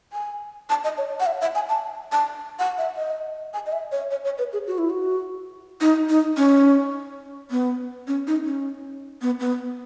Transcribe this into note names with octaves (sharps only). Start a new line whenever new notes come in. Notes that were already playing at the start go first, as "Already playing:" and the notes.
G#5
A5
D#5
C#5
F#5
E5
E5
G#5
A5
A5
F#5
E5
D#5
G#5
D#5
E5
C#5
C#5
C#5
B4
G#4
F#4
E4
F#4
D#4
D#4
C#4
B3
C#4
D#4
C#4
B3
B3